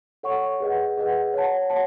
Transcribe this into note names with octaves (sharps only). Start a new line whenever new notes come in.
A4 C#5 F#5 C#6
G#4 B4 D#5 F#5
G#4 B4 D#5 F#5
C#5 F#5 A5
C#5 F#5 A5